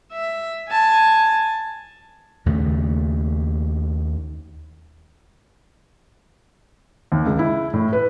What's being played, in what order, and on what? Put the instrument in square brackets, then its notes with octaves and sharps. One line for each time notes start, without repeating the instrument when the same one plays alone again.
[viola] E5
G#5 A5
[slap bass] D#2 C#3 A3
[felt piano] D#2
C#2
E4
A2
B4